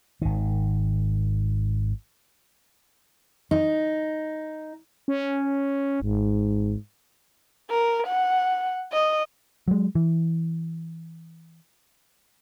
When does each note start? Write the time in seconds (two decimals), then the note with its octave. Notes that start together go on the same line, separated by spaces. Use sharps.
0.22 G#1 D#3
3.51 D#4
5.08 C#4
6.02 G#1 G#2
7.71 A#4
8.07 F#5
8.93 D#5
9.68 F#3 G#3
9.95 E3